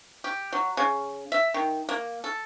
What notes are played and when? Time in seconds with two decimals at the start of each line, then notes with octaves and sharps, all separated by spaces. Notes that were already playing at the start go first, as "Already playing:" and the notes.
0.24 G4
0.52 F#3
0.77 C#3
1.32 E5
1.54 D#3
1.89 A#3
2.24 A4